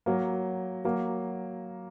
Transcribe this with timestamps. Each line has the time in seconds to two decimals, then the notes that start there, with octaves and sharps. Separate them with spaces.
0.06 F#3 A#3
0.85 F#3 A#3